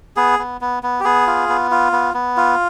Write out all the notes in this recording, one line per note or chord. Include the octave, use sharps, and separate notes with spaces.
B3 G#4
B3
B3
B3
G4
B3 G#4
F4
B3
F4
B3
B3
F4